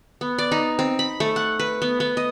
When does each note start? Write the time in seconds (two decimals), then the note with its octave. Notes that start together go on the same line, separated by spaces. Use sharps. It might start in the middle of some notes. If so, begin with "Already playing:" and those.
0.21 B3
0.38 D5
0.52 D#4
0.79 C4
0.99 B5
1.20 A3
1.36 F#5
1.59 B4
1.82 B3
2.00 B3
2.17 D#5